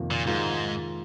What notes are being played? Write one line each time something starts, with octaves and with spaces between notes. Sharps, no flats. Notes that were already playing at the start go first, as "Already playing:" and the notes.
Already playing: F2 C3 D#3 A#3 F4
A#2
G#2 D#3 G#3 F4